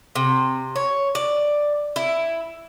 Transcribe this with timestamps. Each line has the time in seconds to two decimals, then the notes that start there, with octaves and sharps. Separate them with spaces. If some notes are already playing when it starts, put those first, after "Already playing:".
0.16 C3
0.76 C#5
1.15 D5
1.96 E4